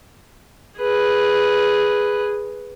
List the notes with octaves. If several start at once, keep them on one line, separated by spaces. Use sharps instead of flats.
G#4 B4